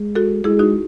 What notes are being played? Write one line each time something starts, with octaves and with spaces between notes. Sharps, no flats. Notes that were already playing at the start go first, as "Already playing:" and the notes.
Already playing: G#3
F#4 A4
G#3 E4 G#4
D#4 F#4